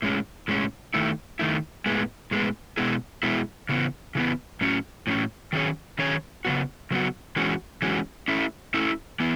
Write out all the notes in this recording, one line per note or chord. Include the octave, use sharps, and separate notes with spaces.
A2 G#3 C#4
A2 G#3 C#4
D#3 A3 E4
D#3 A3 E4
A2 G#3 B3
A2 G#3 B3
B2 G#3 B3 E4 G#4
B2 G#3 B3 E4 G#4
C#3 E3 B3
C#3 E3 B3
A2 F#3 C#4
A2 F#3 C#4
D#3 F#3 C#4 G#4 C#5
D#3 F#3 C#4 G#4 C#5
C#3 F#3 B3 F#4
C#3 F#3 B3 F#4
E3 G#3 C#4 F#4
E3 G#3 C#4 F#4
A3 C#4 E4
A3 C#4 E4
E3 B3 E4